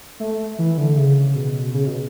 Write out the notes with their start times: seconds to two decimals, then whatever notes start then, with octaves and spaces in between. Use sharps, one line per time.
0.20 A3
0.59 E3
0.77 D3
0.97 C#3
1.35 B2
1.74 C#3
1.87 B2